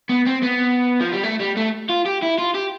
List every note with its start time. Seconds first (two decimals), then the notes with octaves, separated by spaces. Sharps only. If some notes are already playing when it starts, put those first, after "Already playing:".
0.09 B3
0.26 C4
0.42 B3
1.00 F3
1.12 G3
1.23 A3
1.40 G3
1.57 A3
1.89 F4
2.05 G4
2.22 E4
2.38 F4
2.54 G4